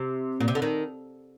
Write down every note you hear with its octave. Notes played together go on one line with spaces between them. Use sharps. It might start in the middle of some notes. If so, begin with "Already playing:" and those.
Already playing: C3
A#2
C3
D3
D#3